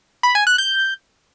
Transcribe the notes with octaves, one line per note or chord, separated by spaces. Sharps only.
B5
G#5
F#6
G6